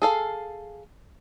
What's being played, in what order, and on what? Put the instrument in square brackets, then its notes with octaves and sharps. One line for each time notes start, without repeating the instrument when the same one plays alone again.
[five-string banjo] G#4 A4 F5